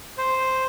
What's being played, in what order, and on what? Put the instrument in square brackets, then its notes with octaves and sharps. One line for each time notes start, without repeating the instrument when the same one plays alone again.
[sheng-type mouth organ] C5